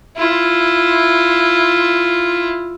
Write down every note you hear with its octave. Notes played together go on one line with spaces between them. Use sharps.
E4 F4